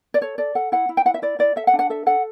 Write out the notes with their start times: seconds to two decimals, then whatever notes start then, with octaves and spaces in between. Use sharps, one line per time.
0.14 D5
0.21 A4 C#5
0.38 A4 D5
0.55 A4 F#5
0.72 E4 F#5
0.89 E4
0.97 G5
1.05 E4 F#5
1.14 E5
1.22 E4 D5
1.39 E4 D5
1.56 A4 E5
1.67 F#5
1.73 D4
1.79 F#5
1.90 A4 E5
2.06 A4 F#5